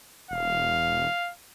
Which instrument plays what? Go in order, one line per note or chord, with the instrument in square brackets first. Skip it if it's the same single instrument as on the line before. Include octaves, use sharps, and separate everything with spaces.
[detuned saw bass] E1 [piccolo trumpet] F5